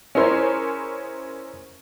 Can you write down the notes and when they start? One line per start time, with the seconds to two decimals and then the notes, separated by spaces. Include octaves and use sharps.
0.15 C#4 E4 G#4 A#4 C5 C#5